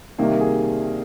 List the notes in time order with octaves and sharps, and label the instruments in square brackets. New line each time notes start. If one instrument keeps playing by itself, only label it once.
[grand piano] C2 C3 D#3 A#3
G#4